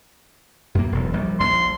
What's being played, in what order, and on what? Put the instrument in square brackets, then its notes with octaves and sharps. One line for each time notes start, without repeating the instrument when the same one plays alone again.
[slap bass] F#2 A#3
E1 B1
A#1 G3
[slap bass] A#1 [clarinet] C6